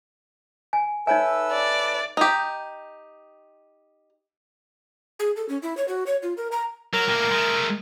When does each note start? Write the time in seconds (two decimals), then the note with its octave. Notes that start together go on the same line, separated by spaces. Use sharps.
0.73 G#5
1.07 D#4 A4 B4 C#5 E5 G#5 E6
1.53 D5
2.17 D#4 G4
5.19 G#4
5.36 A4
5.49 C#4
5.62 E4
5.77 C#5
5.88 F#4
6.06 C#5
6.22 F4
6.37 A#4
6.52 A#5
6.93 F#3 A#4
7.09 A2 A#3
7.31 G#3 A3